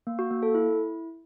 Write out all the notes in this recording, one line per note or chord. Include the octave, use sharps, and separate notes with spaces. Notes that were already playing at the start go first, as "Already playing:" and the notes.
A#3
F#4
A#3
A4
E4